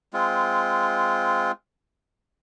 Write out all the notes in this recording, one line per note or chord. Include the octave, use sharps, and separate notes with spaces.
G#3 C4 F4